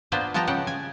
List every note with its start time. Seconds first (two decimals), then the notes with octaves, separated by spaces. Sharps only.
0.12 A#3 B3 D4 F4 B4 C5
0.34 F3 B3 G4 D#5 A5 A#5
0.47 C#3 G4 F#5
0.67 G#5